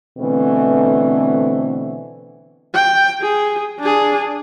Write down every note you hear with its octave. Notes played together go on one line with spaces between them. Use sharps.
B2 D3 E3 A3 C4
G5
G#4
D4 G#4